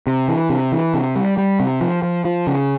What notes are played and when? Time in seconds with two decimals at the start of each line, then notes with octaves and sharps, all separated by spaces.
0.07 C3
0.28 E3
0.50 C3
0.72 E3
0.94 C3
1.16 G3
1.37 G3
1.60 C3
1.81 F3
2.03 F3
2.25 F3
2.47 C#3